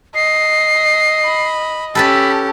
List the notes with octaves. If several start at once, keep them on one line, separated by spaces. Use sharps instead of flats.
D#5 C7
B5
C#4 G4 A4 B4 A5 B5